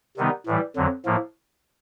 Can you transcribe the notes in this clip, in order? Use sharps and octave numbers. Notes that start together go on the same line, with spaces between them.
C3 D#3 G3 B3 D#4
A2 E3 G3
F2 D3 F#3
A2 F3 A#3